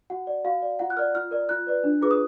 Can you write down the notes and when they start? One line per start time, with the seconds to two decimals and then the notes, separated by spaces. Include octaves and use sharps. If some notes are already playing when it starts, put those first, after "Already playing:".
0.10 F#4 F#5
0.27 D5
0.45 F#4 F5
0.62 D5
0.79 F4 F#5
0.90 F#6
0.97 A#4 D5 F6
1.15 F4 F6
1.31 A#4 D5
1.49 F4 F#6
1.67 B4 D5
1.84 D4
2.02 F4 G#4 B4 D6
2.11 D#6